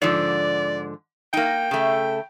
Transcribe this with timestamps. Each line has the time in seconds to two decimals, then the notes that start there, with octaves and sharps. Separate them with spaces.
0.02 G#2 D3 F3 D5
1.33 A#3 D#4 G5
1.71 C#3 A3